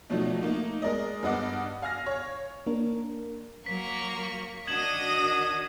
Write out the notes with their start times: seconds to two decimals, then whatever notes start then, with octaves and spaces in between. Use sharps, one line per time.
0.10 B2 F3 F#3 A3 D4 D#4
0.41 A3 A#3 D#4
0.82 G#3 A#4 D5 D#5
1.23 G2 B3 D#5 F#5 D6
1.82 F5 G#5 F6 A#6
2.06 C#5
2.66 A#3 D4 A#4
3.66 F#3 A#3 C#6 B6
4.67 D#3 D4 F#4 D#5 D#6 G#6 E7 F#7